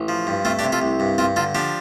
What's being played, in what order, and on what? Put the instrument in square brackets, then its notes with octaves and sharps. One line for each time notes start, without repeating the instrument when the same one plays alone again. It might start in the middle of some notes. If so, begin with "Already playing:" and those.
Already playing: [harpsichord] A1
F3
G2
A3 C4 F4
D4 G4
C3
F4 A4
C2
G2
G2 C4 F4
D3 F4 A4
F3 D4 G4